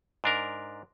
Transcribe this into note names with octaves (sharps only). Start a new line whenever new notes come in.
G#2 D4 A#4